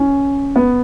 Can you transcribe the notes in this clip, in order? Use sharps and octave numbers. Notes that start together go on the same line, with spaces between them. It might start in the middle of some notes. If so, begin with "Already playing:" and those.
Already playing: C#4
B3